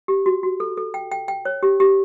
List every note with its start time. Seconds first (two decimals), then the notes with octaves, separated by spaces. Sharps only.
0.08 G4
0.26 F#4
0.43 F#4
0.60 A4
0.77 A4
0.94 G5
1.12 G5
1.28 G5
1.45 C#5
1.63 G4
1.80 G4